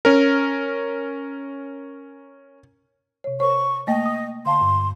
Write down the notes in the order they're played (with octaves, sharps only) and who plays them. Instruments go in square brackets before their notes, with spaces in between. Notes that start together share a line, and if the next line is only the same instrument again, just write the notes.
[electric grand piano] C#4 A#4
[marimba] C3 C#5
[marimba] A#4 C5 C#5 [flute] C#6
[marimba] A3 A#3 G5 [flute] D#5
[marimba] D#6
[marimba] D3 F5 A5 [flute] C6
[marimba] G2